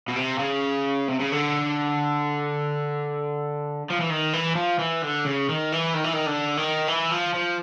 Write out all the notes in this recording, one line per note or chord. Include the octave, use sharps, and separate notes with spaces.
B2
C3
C#3
C3
C#3
D3
F3
E3
D#3
E3
F3
E3
D3
C#3
D#3
E3
D#3
E3
D#3
D3
D#3
E3
F3
F3